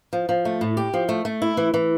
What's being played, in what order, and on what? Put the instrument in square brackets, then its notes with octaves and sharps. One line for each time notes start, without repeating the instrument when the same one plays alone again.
[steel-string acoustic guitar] F3
F3
A3
A2
G4
F3
A3
A3
E4
E3
E3